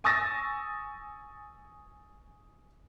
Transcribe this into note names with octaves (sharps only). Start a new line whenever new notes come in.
G#5 C#6 D#6 E6 A6 A#6